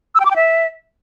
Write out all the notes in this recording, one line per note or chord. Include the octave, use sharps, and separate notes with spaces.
E6
G5
D6
G5
E5